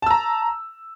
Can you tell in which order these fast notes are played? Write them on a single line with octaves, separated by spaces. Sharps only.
A5 E6 A#5